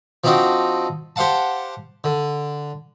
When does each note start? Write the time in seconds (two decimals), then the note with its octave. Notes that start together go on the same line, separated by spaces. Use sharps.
0.24 F3 C4 D4 D#4 F#4
1.16 G4 C5 F5 F#5 A5
2.04 D3